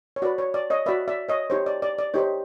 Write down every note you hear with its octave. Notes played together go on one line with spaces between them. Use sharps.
C#5
F#4 B4 D5
C#5
D5
C#5 D#5
F#4 B4 D5 E5
D5 E5
C#5 D#5
D#4 G4 C5 C#5
D5
D5
D5
D#4 G4 C5 C#5